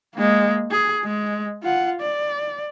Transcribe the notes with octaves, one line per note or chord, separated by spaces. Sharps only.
G#3 A#3
G#4
G#3
F4 F#5
D5